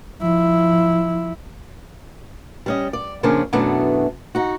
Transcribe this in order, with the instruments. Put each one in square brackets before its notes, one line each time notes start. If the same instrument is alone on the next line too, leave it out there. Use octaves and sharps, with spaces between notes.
[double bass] F3 E4
[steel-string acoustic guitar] G3 C#4 D#5
D5
F2 C#3 F3 A#3 C#4 D4
F#2 B2 E3 A3 B3 D4
D#4 F#4